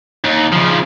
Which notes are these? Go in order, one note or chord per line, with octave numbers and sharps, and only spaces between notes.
D#2
C#3 F3